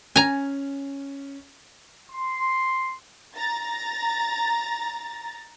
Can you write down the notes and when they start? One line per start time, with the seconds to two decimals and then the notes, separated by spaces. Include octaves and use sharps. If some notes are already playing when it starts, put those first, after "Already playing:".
0.16 C#4 G#5 A#5
2.11 C6
3.36 A#5 A6